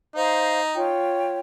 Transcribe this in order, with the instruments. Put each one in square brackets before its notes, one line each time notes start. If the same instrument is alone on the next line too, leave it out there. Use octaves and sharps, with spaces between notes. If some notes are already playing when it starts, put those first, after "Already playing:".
[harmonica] D#4 [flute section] C5 F5
[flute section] F4 C#5 G5